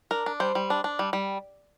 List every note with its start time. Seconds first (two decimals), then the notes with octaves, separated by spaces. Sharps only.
0.11 D4 A#4
0.26 D4
0.40 G3 C5
0.55 G3
0.70 D4
0.84 D4
0.99 G3
1.13 G3